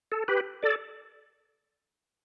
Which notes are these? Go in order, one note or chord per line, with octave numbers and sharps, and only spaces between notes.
A4
G4 B4
A4 D5